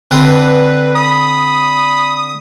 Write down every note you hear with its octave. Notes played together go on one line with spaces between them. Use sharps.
D3 C4 B4
B5 D#6